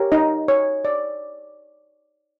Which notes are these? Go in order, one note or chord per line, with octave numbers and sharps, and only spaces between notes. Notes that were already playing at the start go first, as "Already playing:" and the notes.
Already playing: G4 A#4 C#5
D#4 D#5
C#5
D5